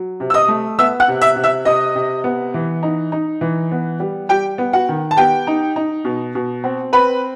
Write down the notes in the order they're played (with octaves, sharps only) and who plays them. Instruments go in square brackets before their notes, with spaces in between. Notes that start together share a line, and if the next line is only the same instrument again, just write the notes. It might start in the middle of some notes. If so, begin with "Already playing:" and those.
Already playing: [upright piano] F#3
C3
E6
D#5 D#6
A3
B3 E5 E6
F#5 F#6
C3
E5 E6
C3
E5 E6
C3 D#5 D#6
C3
B3
E3
D#4
D#4
E3
B3
G3
G3 G4 G5
B3
F#4 F#5
D#3
A5
B3 G4 G5
D#4
D#4
B2
B2
C4
C4 B4 B5